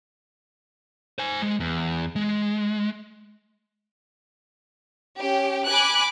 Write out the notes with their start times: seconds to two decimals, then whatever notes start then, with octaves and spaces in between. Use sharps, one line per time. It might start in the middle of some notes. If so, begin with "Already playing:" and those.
1.19 C5 G#5
1.42 G#3
1.60 E2
2.16 G#3
5.15 C#4 G4
5.66 G#5 B5 D6 F#6